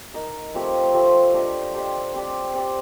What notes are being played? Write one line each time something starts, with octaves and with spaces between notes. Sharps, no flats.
D#4 A#4 D#5
F3 A3 C4 G4
F3 A3 C4 G4
D4 G4 C5 D#5
D4 G4 C5 D#5
C4 G4 D5
C4 G4 D5